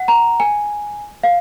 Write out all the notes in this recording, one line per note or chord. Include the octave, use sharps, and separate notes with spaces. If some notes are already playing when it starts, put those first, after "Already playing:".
Already playing: F#5
A#5
G#5
F5